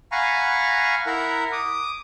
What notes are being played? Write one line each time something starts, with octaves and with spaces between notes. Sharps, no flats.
F5 F#5 G#5 A#5 B5 C#6
E4 A#4 E5 F#5 A#5
D6 D#6